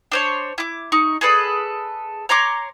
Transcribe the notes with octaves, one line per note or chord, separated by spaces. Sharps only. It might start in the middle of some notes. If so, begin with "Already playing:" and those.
D4 C5 C#5
E4 D6
D#4 C#6
G#4 A4 B4 D5
C#5 A#5 C6 D6